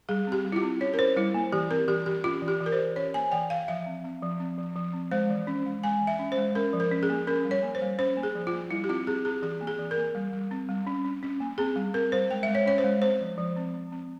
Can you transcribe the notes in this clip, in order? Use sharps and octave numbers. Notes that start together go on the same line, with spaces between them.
G3 G#4
C4 G4
G3
E4
F4
C4
C#4 C#5
A#4
C#4 C5
G3 E4
A#3
E3 G4
C4 A#4
E3 G4
E3 G4
C#4 F4
E3
G4
E3
A#4
C5
E3
C#4 C#5
A#3 G#5
E3 G5
E3 F5
F3 E5
C4
C4
F3
C4
F3
F3
C4
G#3 C5
E3
C#4
G#3
G#3 G#5
E3
E5
C#4
C5
G#3
C#4 A#4
F3
A#4
C#4
G#4
A#3
C#4 A#4
G3
C#5
A#3
C5
G3
C#4 C5
A#3
G#4
F3
F4
A#3
G3 E4
G4
C4 F4
C4 G#4
C4 G#4
E3 G#4
A#3
G#4
E3
A#4
A#3
G3
G3
C4
G3
C#4
C#4
C#4
A#3
C4 G#4
G3
C4 A#4
G3 C5
G#3 G5
E5
G#3
C#5
C#4 C#5
C5
G#3
C4 C5
F3
F3
C4
C4
C4